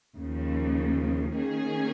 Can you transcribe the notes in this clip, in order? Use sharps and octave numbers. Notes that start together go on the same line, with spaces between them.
D#2 C#3 F3
D#3 A#3 C#4 G#4